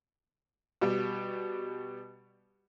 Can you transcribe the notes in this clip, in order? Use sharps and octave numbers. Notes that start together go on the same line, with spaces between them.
B2 G3